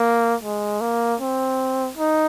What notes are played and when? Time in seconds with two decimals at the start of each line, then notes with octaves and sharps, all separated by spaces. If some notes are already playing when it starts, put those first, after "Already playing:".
Already playing: A#3
0.43 G#3
0.81 A#3
1.20 C4
1.97 D#4